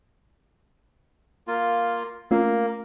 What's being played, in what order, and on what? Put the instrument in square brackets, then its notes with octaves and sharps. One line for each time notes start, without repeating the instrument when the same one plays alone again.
[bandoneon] A#3 F4
[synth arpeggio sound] A3 C#4 F4 [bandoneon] A#3